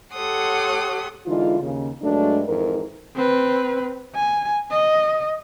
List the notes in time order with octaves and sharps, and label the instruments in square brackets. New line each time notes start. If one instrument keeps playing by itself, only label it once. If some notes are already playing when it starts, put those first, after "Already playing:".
[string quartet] G4 A4 C#5 F#5 C6 D#6
[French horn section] D3 E3 G#3 D#4 F4
D#2 C#3
G2 F#3 G#3 A3 D4
F2 G#2 E3 A#4
[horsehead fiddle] C4 B4
G#5
D#5